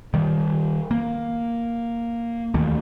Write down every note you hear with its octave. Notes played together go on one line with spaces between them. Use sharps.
D#3 G3
A#3
D#2 D#3 A3 A#3